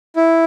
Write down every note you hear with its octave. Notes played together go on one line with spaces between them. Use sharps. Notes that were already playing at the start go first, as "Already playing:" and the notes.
E4